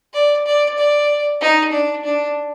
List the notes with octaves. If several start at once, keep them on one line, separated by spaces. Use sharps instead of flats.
D5
D5
D5
D#4
D4
D4